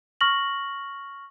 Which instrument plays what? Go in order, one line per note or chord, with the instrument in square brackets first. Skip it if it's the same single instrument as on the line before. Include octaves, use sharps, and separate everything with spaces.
[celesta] C#6 F6 A#6 F#7